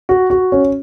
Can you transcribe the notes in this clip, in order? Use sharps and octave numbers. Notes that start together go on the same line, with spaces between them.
F#4
F#4
C#4